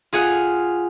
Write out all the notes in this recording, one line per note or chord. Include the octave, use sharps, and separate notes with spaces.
F4 G#4 F5 F#5